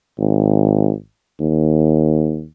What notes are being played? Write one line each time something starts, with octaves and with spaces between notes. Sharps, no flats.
G#1
D#2